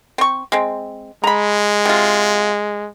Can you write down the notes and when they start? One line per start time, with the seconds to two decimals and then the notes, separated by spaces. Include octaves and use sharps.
0.18 C4 C#6
0.52 G#3 C4
1.24 G#3 A#5 B5
1.86 C3 F4